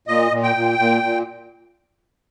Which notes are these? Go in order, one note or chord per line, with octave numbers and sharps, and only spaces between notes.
A#2 D#5
A#2
G5
A#2
A#2
A#2